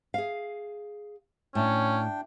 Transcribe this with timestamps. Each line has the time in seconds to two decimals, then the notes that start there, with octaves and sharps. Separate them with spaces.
0.14 G#4 F5
1.55 A2 C#4 D4 G5